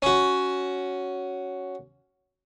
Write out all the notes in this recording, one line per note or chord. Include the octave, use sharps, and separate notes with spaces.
C#4 F#4